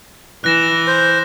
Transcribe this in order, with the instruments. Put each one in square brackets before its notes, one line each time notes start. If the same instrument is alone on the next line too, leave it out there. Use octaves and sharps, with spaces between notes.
[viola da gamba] E3 [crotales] F#6 A#6 E7
[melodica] C5